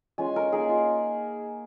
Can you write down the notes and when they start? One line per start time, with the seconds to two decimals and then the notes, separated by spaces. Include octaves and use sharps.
0.18 G#3 C#4 F4 G#5
0.36 A#4
0.52 A#3 D#4 G#4
0.69 F4